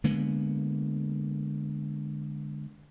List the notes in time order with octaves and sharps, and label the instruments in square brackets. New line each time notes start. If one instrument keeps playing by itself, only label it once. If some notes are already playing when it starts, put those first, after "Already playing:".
[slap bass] D3 G#3 A#3 B3